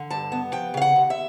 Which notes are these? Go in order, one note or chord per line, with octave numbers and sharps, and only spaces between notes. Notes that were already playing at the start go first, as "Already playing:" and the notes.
Already playing: D3
G2 A5
B3
F3 G5
C#3 F5
F#5
D#2
E5